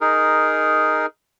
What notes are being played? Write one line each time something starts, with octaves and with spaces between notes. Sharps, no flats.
D#4 G#4 A#4